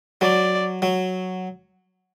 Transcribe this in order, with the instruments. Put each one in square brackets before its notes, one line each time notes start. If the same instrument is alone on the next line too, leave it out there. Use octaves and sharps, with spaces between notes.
[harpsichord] F#3 [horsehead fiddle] D5
[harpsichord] F#3